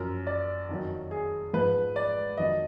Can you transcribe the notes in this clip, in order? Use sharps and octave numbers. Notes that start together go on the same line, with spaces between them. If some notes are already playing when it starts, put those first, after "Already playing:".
Already playing: F#2 F3 A#4
D5
F2 D#3 F#3
G#4
G#2 F3 B4
D5
F2 D#3 F#3 D#5